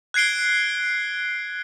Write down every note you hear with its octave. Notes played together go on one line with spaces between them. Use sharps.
F#6 G#6 C7 D7 G7